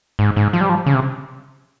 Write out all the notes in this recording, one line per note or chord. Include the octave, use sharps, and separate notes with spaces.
G#2
G#2
F3
G3
F3
C#3
C3